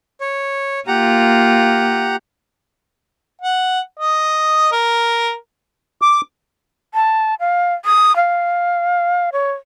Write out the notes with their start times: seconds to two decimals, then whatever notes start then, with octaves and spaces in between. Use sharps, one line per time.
0.21 C#5
0.87 A#3 F4 G4 F#5 A#5
3.41 F#5
3.99 D#5
4.72 A#4
6.02 D6
6.94 A5
7.40 F5
7.85 D#6
8.16 F5
9.33 C#5